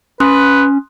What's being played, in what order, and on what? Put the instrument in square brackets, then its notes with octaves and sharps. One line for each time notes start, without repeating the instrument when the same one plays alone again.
[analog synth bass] C#4 [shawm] B4 [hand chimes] C6 D#6 F#6